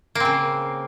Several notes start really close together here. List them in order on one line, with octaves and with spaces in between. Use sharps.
A#3 C4 C#3